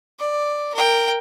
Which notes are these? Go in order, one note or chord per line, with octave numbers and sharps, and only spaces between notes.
D5
A#4 G5